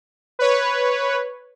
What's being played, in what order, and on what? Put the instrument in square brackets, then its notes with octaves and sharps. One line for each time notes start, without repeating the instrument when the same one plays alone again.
[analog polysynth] B4 C#5